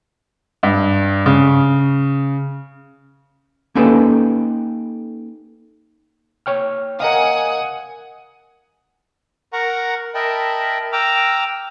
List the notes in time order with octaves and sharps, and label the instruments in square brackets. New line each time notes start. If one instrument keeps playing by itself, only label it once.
[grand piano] G2
C#3
[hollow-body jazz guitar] A#3 C#4 D#4 G4 A4 B4
[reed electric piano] C#5 G5 F6
[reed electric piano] A#4 D#5 F5 [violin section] F#5 G#5 D#6
[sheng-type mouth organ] A#4 F#5 A#5 C#6
A#4 D#5 E5 G5 A5 B5
G5 A#5 D6 E6 F6